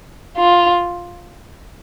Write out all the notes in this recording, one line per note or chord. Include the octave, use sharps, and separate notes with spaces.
F4